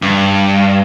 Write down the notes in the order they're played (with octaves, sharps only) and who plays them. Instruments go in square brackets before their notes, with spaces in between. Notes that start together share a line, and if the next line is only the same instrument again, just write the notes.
[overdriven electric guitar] G2